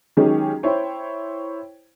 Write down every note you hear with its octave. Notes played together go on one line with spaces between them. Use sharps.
D#3 F#3 G#3 C#4 G4 G#4
E4 C5 C#5 G5